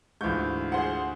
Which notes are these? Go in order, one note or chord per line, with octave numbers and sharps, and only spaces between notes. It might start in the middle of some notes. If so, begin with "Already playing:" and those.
D2 G#2 E3 F4 C#6 G6
G#4 C5 F#5